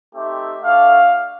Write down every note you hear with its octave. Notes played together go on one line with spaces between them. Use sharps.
A3 C4 D#4 G4 E5
A3 D4 F#4 F5